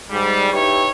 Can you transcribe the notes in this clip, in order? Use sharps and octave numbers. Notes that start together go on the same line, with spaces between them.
G#2 G3
D#4 E4 G4 B4 C#5